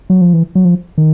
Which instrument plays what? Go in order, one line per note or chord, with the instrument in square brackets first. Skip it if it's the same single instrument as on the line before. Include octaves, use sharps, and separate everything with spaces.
[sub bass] F#3
F3
E3
F#3
F3
D#3